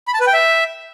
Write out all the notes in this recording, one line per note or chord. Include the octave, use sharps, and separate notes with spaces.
B5
A5
B4
G5
E5